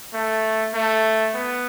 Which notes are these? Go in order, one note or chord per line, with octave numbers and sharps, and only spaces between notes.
A3
A3
B3